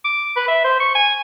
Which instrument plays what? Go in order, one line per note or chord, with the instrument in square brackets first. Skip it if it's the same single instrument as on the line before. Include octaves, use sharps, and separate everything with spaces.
[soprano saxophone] D6
B4
E5
C5
C#6
G#5